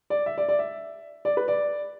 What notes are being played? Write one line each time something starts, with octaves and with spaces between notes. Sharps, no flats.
D5
E5
D5
D5
E5
D5
B4
D5